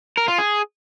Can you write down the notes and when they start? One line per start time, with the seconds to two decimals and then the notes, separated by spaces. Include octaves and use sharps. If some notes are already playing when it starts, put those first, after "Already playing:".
0.17 A#4
0.28 F4
0.38 G#4